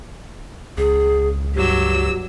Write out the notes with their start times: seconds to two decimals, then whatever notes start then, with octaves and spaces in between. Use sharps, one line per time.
0.78 C#2 G#4
1.55 G2 F#3 G4 E6